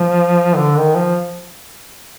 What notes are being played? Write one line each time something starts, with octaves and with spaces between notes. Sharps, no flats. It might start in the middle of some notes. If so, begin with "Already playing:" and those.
Already playing: F3
D3
D#3
F3